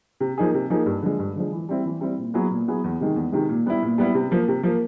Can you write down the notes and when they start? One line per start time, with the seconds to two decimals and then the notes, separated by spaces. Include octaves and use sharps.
0.20 C3
0.38 F3 A#3 D#4 G#4
0.54 C3
0.70 F3 A#3 D#4 G#4
0.86 G2
1.02 D3 F3 G#3
1.19 G2
1.36 D3 F3 G#3
1.52 E3
1.69 G3 C4 E4
1.86 E3
2.01 G3 C4 E4
2.18 A#2
2.34 F#3 B3 E4 G#4
2.51 A#2
2.68 F#3 B3 E4 G#4
2.84 E2
3.01 C3 D#3 G#3
3.16 E2
3.32 C3 D#3 G#3
3.49 A#2
3.66 G3 B3 E4
3.82 A#2
3.98 G3 B3 E4
4.15 C3
4.31 F3 A#3
4.48 C3
4.63 F3 A#3